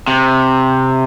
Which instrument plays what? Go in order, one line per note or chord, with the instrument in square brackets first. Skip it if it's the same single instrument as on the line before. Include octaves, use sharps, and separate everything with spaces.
[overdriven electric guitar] C3